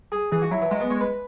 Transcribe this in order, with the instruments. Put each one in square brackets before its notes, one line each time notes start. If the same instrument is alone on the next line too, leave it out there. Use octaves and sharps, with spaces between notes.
[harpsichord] G#4
[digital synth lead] E3 [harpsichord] G#4
[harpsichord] F#4
[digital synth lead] F#3 [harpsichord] E4
[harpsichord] E3
[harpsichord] F#3 [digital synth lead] G#3
[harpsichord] B3
[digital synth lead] G#3 [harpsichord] C#5
[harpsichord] B4